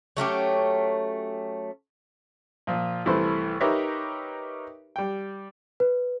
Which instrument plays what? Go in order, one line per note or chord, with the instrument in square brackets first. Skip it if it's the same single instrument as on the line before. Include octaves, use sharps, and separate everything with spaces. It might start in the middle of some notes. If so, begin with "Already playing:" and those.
[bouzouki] F#3 A3 C#4 G4
[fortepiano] A#2 F3
C2 E3 A3 E4 B4 C5
D#4 G4 A#4 B4 C#5 E5
G3 G5
[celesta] B4